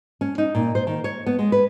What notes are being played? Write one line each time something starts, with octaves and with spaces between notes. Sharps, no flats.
C#4
D#4
A#2
C5
D#3
C#5
B3
G#3
B4